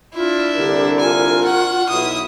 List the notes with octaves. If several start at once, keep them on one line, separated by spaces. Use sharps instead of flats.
D4 E4 F4
C2 D3 G4 A#4
F4 G#5
F#4 F#5
B1 E4 D#6